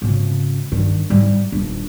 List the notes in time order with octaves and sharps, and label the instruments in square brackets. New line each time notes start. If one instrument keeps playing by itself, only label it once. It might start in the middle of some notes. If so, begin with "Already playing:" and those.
[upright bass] G#1 C#3
G2 D#3
G#2 G3
D#1 D4